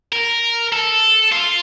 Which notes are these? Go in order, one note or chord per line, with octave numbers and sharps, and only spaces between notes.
A#4
A4
F4